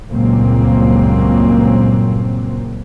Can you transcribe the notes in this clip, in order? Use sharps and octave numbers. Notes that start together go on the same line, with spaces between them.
C#2 G2 A#2 F#3 A#3 C4